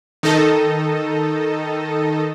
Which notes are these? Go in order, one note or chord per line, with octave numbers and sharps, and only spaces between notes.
D#3 D#4 A4 D#5